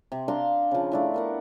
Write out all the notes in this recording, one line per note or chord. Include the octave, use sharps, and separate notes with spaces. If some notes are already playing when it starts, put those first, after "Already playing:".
C3
D4 F5 A#5 C6
C#3 F3
A3 D4 E4
B3 A#4 F#5